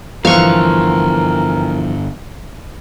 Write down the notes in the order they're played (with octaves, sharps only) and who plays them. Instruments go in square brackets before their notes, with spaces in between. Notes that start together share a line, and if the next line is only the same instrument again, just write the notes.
[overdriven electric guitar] G2 D3 [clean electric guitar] E3 F3 [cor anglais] A#4 [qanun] F5 C#6